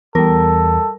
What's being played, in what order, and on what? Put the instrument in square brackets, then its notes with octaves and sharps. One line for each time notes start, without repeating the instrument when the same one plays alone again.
[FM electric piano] E2 [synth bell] G3 A#4 [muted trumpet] A4